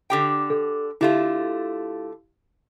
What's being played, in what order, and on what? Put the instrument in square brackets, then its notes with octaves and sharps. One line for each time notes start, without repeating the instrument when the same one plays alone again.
[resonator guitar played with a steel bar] D3 G4 G5
[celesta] A4
[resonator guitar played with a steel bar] D3 A3 F4 [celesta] E4 G4 F5